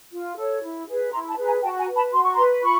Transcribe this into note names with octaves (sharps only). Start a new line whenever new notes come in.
F4
A4 C#5
E4
G#4 B4
E4 A#5 C6
A5 B5
G#4 B4
G#5 A#5
F#4 G5 A5
G#5 A#5
B4
A5 B5
F#4 C6
C#6
B4 A#5 C6
F4 B5 C#6